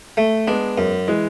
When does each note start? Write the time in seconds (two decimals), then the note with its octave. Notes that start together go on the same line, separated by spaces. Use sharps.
0.17 A3
0.47 G#3 B3 D4
0.78 F#2
1.08 E3 G#3